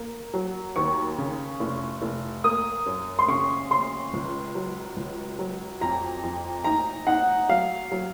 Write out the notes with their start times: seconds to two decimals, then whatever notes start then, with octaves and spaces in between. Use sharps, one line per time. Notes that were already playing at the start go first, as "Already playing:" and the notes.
Already playing: A#3
0.34 F#3
0.76 D#2 C#6
1.18 C#3
1.60 F1
2.02 F1
2.44 A#3 D#6
2.86 F#2
3.19 C6
3.28 C#3 C#6
3.70 C#3 C6
4.13 C#2
4.55 F#3
4.97 C#2
5.39 F#3
5.81 F2 A#5
6.23 F2
6.64 D#4 A#5
7.07 D#4 F#5
7.49 F#3 F5
7.92 F#3